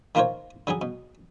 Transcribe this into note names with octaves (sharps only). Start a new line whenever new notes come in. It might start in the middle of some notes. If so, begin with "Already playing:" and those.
D#3 A#3 F4 A#4 C5 C#5
D3 F#3 G3 G#4
B2